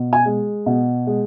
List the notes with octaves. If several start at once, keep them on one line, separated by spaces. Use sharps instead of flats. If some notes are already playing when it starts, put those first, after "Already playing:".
Already playing: B2
G#5
G#3
B2
G#3